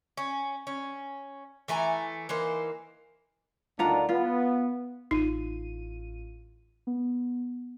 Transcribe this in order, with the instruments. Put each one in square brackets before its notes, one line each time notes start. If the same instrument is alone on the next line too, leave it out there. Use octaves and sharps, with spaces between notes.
[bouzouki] C#4
C#4
E3 A3 G#5 A#5
E3 A#3 D#4 C5
[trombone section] D2 D#3 D4 [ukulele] F4 F#5 A#5
[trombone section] B3 [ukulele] F4
[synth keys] A1 F4 D#7 [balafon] D#4
[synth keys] B3